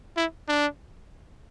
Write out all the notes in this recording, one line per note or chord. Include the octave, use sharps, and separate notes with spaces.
E4
D4